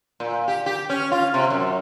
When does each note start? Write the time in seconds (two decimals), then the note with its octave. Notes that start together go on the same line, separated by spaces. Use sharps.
0.20 A#2
0.48 G4
0.66 G4
0.90 C#4
1.12 F4
1.34 C3
1.50 F#2